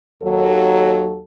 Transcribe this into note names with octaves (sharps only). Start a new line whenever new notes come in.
D#2 F#3 A4